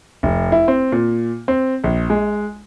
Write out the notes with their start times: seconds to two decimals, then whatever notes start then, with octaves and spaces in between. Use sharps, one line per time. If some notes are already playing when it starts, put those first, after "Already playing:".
0.23 F1
0.52 E4
0.68 C4
0.92 A#2
1.48 C4
1.84 A#1
2.10 G#3